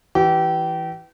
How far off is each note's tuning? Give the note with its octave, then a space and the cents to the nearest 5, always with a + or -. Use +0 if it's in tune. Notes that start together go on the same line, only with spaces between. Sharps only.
E3 +0 G4 -30